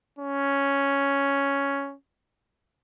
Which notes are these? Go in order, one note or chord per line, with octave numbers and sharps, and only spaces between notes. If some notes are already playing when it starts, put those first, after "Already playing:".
C#4